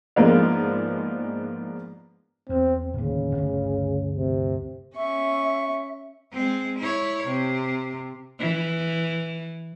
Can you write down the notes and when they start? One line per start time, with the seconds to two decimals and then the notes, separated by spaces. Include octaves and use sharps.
0.16 G#2 F3 G#3 A#3 B3 D4
2.49 E2 C4
2.94 D1 D#2 C#3
3.35 G1 D2
4.16 C3
4.96 C#4 E5 C#6
6.33 G#3 C4
6.79 E4 C#5
7.27 C3
8.40 E3